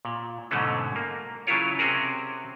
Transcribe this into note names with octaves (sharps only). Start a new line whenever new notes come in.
A#2
G#2 B2 D3 F#3 A3 C#4
A#3
C#3 F#3 E4 F4 C#5
C3 C4 C#4 F#4 G#4 A#4